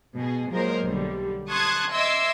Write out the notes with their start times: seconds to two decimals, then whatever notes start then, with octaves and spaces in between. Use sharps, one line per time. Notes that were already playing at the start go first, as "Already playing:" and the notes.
0.15 B2 G#4
0.51 F3 F#3 G#3 A#3 A#4 C5
0.83 B1 D3 G3
1.49 A5 C6 C#6 D#6 F#6 G#6
1.92 D#5 E5 C6 D6 E6 G#6